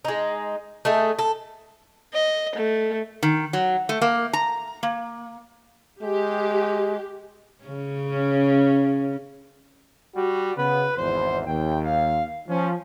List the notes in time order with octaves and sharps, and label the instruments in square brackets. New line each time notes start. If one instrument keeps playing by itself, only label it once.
[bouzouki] G#3 D#4
A3 D#4 G#4
A4
[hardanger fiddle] D#5
A3
[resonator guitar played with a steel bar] D#3
F#3
A3
A#3
A#5
A#3
[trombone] G#3 [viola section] G4
[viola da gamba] C#3 C#4
[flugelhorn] G3 [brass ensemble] F#4
[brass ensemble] C#3 B3 [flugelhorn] B4
[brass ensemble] G#1 E2 [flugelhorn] C5
[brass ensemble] D#2 [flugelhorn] G5
[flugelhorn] F5
[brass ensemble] F3 [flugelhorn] C#4